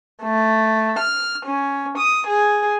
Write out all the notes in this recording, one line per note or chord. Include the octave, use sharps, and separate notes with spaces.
A3
F6
C#4
D#6
G#4